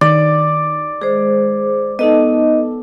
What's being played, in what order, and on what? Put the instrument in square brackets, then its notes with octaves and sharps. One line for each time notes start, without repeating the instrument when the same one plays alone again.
[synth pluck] D#3 [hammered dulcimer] D5
[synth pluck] G#3 [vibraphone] G#4 C5
[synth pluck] B3 A4 [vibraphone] D#4 D#5